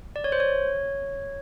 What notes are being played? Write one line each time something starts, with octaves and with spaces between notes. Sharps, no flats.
D5
C#5
C5
C#5